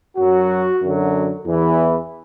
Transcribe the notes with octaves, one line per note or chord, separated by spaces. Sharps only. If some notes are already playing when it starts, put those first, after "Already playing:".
F#2 F#3 F#4
F#2 D3 F#3
E2 E3